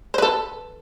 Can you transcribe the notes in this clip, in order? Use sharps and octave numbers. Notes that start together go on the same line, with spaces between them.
A4 B4 C5